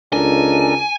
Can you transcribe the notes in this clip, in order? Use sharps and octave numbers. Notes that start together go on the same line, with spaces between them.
C#2 D4 A4 A#4 G#5